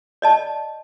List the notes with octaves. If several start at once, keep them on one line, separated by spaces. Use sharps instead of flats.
D5 D#5 A5